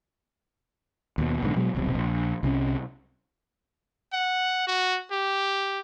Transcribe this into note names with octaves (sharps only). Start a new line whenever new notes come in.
D#2 B2
B1 G#2 D3
B2 F#3 G#3
D#1 B1 C3
A#1
C2 C3 C#4
F#5
F#4
G4